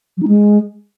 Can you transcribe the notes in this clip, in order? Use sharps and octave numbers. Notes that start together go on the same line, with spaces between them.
F#3
D#4
G#3